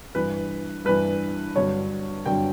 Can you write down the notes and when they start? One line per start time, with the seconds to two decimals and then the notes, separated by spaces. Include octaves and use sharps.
0.15 G2 E3 B4
0.85 G2 E3 B4
1.55 G2 D3 F#3 C#5
2.25 G2 D3 F#3 G5